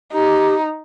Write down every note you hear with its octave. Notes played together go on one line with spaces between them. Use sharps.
D#4 G4